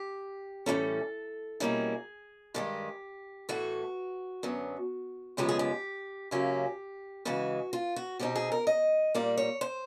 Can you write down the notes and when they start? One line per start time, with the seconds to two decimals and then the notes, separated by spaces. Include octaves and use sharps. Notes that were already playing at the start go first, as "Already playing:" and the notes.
Already playing: G4
0.66 A2 E3 G3 A#3 C#4 A4
1.60 B2 G3 A#3 C#4 E4 G#4
2.54 G2 D#3 G#3 G4
3.49 A2 E3 A3 F#4
4.43 F#2 D3 F#3 B3
5.37 F#2 C#3 F3 G#3 B3 G4
5.49 G#4
5.59 G4
6.31 F#2 C#3 F#3 A#3 C#4 G4
7.25 C#3 E3 G#3 F#4
7.73 F4
7.96 F#4
8.19 B2 G#3 C4 D#4 G4
8.36 G#4
8.52 A#4
8.67 D#5
9.15 A#2 G3 A#3 D5
9.38 C#5
9.61 C5